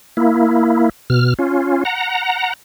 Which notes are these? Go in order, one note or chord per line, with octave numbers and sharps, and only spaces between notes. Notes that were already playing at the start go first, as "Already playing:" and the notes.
A#3 E4
B2 F6
C#4 F4
F#5 A#5